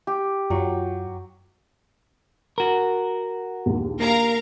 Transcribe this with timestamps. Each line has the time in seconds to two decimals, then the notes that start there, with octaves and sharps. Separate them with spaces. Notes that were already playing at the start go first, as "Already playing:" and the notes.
0.07 G4
0.50 F#2 F#3 F4
2.58 F#4 A#4
3.66 A#1 D#2
4.00 A#3 A#4 F5 A#5